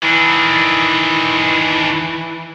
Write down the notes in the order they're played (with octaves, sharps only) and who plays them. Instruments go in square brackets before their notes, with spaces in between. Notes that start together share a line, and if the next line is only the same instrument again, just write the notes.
[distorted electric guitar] D#3 D4 [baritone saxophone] E3